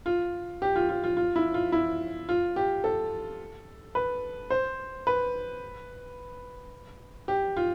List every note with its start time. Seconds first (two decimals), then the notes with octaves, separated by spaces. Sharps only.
0.06 F4
0.62 G4
0.76 F4
0.89 F4
1.04 F4
1.17 F4
1.36 E4
1.54 F4
1.72 E4
2.29 F4
2.56 G4
2.84 A4
3.95 B4
4.50 C5
5.07 B4
7.28 G4
7.57 F4